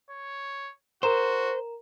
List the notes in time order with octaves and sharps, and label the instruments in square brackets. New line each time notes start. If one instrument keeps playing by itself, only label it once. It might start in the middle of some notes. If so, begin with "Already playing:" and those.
[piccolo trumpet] C#5
[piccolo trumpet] F#4 [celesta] A#4 A#5 E7 [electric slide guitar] C5